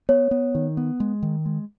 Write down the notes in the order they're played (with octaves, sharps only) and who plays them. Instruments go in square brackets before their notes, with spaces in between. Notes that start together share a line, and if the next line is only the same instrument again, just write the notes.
[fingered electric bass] B3 [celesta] C#5
[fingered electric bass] B3
D#3
B3
G#3
D#3
G#3